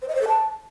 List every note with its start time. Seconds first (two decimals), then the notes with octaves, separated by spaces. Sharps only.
0.02 C5
0.08 D#5
0.15 C5
0.21 A4
0.28 A5